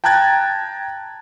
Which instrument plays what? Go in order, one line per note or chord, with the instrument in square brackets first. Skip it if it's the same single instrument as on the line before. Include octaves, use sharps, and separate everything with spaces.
[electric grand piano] G5 A5 A#5 F#6 G#6 A6